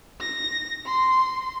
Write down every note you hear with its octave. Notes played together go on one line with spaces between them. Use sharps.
A#6
C6